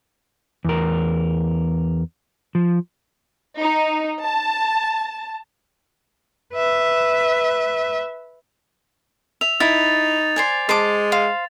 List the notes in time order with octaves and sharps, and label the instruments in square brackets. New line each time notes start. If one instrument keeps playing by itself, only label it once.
[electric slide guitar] E2 A#4
F3
[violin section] D#4
A5
[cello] B4 E5
[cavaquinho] E5 [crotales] F7
[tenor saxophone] D#4 [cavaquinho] E4 [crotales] A6
[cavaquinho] C5 D5 G#5
[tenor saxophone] G#3 [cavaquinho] C5 A5 D6
[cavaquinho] C5 F5